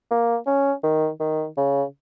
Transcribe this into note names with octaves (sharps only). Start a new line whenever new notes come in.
A#3
C#4
D#3
D#3
C#3